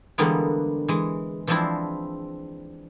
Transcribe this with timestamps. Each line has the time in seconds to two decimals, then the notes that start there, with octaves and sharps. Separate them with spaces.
0.18 D3 E3 G3 G#3 A#3 B3
0.88 E3 G#3
1.47 E3 F3 G#3 C4 D4 E4